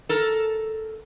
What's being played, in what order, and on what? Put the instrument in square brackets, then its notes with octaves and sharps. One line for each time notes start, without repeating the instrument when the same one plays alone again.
[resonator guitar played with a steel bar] A4 A#4